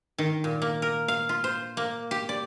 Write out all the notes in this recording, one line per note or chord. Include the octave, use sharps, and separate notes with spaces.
D#3
A#2
A#3
A#4
F5
F4
C5
A#3
G4
D5